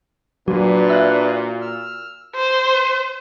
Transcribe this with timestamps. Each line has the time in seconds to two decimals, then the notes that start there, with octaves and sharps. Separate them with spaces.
0.48 A#2 F#3 D4 F#4 B4
0.90 E5 F#6
1.61 E6 F6
2.35 C5